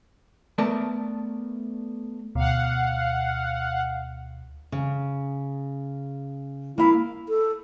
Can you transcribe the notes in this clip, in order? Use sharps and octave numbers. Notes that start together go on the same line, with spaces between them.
A3 B3 A#4 D5 A5
D2 B2 F5 F#5
C#3
A#3 E4 F5
A4